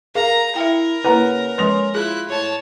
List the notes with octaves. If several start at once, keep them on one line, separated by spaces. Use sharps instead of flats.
G#4 A#4 F5 A#5
E4 A#4 E5 G5
C#3 A#3 E4 B4 F#5 A#5
F3 G#3 C#4 B4 C6 A#6 F7
E4 F4 G#4 F#6
A2 C#5 A5